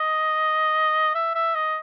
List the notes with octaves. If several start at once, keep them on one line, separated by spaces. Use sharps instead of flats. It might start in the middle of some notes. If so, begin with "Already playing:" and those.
Already playing: D#5
E5
E5
D#5